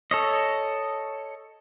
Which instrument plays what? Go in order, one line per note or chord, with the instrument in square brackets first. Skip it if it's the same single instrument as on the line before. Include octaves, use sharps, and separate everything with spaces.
[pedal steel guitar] A4 C#5 D#5